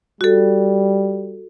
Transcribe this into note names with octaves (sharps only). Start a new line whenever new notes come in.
G3 F#4 A4